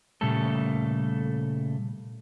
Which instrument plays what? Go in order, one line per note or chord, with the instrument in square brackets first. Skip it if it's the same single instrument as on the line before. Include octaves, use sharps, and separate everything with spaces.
[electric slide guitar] A#2 C#3 G3 A3 A4